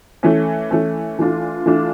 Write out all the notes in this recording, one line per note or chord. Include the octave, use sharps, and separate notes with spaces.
E3 A3 C#4
E3 A3 C#4
E3 A3 D4 F4
E3 A3 D4 F4